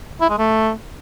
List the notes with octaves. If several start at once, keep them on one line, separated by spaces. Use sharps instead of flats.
E4
G#3
A3